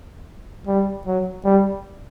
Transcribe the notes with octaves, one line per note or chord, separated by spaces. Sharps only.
G3
F#3
G3